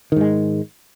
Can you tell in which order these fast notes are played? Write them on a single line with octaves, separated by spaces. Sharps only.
D#3 G#2 G#3